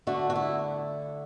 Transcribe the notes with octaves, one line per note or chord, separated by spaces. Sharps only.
D3 A3 F#4
F#4
E4